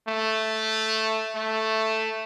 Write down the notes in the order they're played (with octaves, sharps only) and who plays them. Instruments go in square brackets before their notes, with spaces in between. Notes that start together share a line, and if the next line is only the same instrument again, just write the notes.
[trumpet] A3
A3